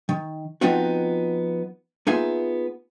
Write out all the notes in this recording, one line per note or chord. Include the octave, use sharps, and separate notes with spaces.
D#3
F3 B3 C4 D#4 F4 F#4
A#3 B3 D#4 F4 G#4 E5